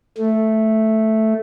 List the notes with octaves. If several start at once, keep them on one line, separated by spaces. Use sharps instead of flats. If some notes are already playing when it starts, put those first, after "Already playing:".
A3